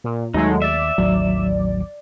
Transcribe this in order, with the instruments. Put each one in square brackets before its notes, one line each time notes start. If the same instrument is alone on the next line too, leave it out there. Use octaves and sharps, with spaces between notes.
[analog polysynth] A#2
[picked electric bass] D#2 [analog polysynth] F#3 G#3 A3 [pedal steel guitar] D#4
[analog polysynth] D5 [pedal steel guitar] E5
[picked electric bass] A1 D#2 [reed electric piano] F#3